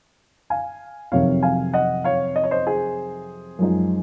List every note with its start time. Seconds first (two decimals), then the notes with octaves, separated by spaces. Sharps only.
0.50 F5 G#5
1.12 F2 C3 D#3 F#3 C4 C#5 F5
1.43 F5 G#5
1.73 D#5 F#5
2.04 C#5 F5
2.36 D#5
2.44 C#5
2.51 C5 D#5
2.67 G#4 C5
3.59 F#2 F3 G#3 D#4